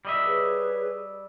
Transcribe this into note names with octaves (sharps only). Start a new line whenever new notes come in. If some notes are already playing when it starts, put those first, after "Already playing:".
G3 D#5 E5
G#4 B4 C#5